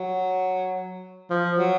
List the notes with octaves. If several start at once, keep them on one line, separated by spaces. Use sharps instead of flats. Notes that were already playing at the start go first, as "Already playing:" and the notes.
Already playing: F#3
F3
F#3